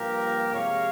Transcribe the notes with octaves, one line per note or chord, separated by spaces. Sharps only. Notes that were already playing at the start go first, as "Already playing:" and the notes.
Already playing: G2 F3 A#3 G4 A#4
C3 F3 G#3 C#5 F5